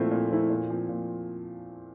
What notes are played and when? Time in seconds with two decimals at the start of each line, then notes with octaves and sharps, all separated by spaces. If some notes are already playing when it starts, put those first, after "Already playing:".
Already playing: A#2 F3 A3 C4 E4
0.11 A#2
0.30 F3 A3 C4 E4
0.50 A#2
0.70 F3 C4
0.89 A#2